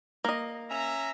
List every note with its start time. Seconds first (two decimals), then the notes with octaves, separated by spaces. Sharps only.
0.24 A#3 D#5
0.69 C#4 E5 A#5